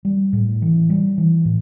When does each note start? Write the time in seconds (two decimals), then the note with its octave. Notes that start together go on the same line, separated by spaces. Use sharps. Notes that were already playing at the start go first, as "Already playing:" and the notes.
0.05 G3
0.33 A2
0.62 E3
0.90 G3
1.18 E3
1.45 A2